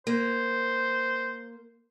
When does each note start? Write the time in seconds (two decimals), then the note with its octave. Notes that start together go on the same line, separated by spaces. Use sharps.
0.07 A#3 C5